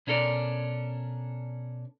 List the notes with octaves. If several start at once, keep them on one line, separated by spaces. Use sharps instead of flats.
B2 C#4 D4 A4 A#4 D5